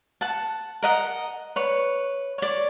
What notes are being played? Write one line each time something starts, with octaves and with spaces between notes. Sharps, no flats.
F#5 A5
A#4 D#5 F#5
B4 C#5
C#5 D5